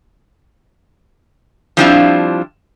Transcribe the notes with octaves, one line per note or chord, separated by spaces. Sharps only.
F3 G3 C4 D4 E4 F4